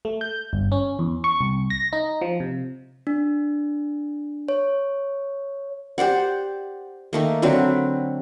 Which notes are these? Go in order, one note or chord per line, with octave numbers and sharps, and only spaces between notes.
A3
G6
G1
C#4
E2
C#6
C2
A#6
D#4
F3
C3
D4
C#5
G4 C5 D5 F#5
D#3 A3 A#3
D3 F#3 C4 B4